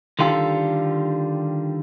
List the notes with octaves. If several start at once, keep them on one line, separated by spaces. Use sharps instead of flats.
D3 D#3 G3 F4 G4 A4